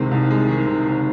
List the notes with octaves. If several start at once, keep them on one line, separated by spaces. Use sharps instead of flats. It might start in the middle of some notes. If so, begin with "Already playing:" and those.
Already playing: C2 C3 D#3 G#3
C2
G#3
D#3
C3
F#1